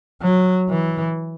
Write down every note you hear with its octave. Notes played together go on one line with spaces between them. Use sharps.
F#3
E3